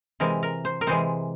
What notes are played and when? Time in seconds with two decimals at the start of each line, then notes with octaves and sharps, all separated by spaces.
0.20 C3 E3 G#3 A#4
0.43 A#4
0.65 C5
0.81 A#4
0.87 C3 E3 G#3 C5